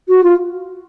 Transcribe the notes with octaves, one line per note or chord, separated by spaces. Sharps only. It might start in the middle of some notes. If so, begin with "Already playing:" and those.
F#4
F4